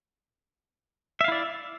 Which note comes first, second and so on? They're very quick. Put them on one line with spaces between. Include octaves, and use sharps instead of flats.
E5 F5 E4 D5